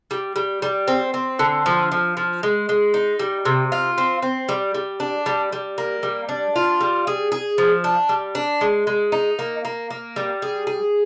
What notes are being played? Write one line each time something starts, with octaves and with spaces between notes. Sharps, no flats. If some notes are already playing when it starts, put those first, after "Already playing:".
G3
G3
G3
C4
C4
D3
F3
F3
F3
G#3
G#3
D#4
G3
C3
F4
C4
C4
G3
G3
D4
G3
G3
A#3
G3
D4
F4
G3
G#4
G#4
F3
D4
G3
D4
G#3
G#3
D#4
A#3
A#3
A#3
G3
G#4
G#4